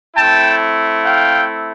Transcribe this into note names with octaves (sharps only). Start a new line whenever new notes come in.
A3 C4 E4 G5 A5
F5 G5